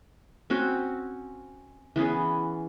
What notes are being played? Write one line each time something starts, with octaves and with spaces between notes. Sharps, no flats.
C4 C#4 F#4
E3 B3 C#4 G#4